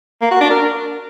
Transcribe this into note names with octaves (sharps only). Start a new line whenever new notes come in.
A#3
F#4
D4
A#4